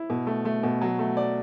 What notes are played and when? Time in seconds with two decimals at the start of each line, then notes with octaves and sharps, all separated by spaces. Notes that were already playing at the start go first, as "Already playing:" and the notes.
Already playing: E4
0.10 B2
0.27 A3
0.45 A3
0.63 B2
0.82 F#3
0.99 A3
1.17 D5